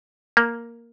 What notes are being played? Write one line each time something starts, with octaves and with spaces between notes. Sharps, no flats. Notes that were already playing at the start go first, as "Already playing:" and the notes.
A#3